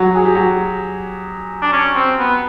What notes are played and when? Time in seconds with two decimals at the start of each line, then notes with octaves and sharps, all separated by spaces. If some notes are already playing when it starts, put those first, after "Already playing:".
Already playing: F#3 F#4
0.15 G#4
0.25 G4
0.35 F#3 F#4
1.62 D4
1.73 C#4
1.96 C4
2.19 B3